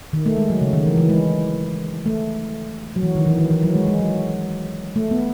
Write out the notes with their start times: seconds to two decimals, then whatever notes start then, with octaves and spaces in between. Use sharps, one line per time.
0.13 D#3
0.26 A3
0.37 G#3
0.50 F#3
0.61 C#3
0.73 D#3
0.86 E3
0.97 E3
1.10 G#3
2.06 A3
2.96 F#3
3.03 E3
3.15 D#3
3.26 E3
3.39 D#3
3.51 E3
3.63 F#3
3.75 G#3
3.88 G#3
3.99 F#3
4.96 A3
5.11 B3